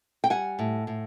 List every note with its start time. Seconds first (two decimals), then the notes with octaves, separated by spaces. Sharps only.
0.24 G5
0.30 G3 F#5 G#5
0.59 A2
0.87 A2